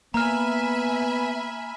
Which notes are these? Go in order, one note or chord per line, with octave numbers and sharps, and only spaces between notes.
A#3 B3 E5 G#5 A#5 B5 F6